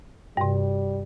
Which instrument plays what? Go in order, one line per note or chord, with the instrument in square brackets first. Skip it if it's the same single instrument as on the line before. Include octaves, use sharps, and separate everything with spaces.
[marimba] G2 C3 [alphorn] G3